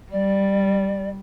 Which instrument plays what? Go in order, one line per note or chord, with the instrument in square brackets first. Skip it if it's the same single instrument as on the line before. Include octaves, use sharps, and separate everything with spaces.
[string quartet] G3 [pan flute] D5